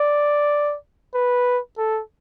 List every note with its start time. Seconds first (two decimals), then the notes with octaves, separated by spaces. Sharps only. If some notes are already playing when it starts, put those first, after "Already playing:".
Already playing: D5
1.14 B4
1.78 A4